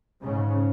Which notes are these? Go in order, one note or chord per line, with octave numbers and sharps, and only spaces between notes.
G#2 C#3